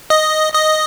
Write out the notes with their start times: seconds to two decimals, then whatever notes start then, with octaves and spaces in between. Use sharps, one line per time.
0.10 D#5
0.54 D#5